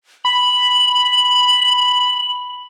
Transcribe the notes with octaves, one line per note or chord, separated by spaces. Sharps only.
B5 F#7